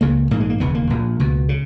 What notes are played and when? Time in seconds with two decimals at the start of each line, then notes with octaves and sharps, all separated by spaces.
0.01 C#2 C#3 A#3
0.31 A#1 G#2 A#3
0.40 G#3
0.50 A#3
0.60 E1 D#2 C#3 B3
0.75 A#3
0.90 A#1 A#2
1.20 C#2 B2
1.49 C#3